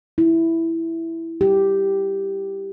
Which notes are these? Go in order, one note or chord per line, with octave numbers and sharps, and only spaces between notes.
E4
G4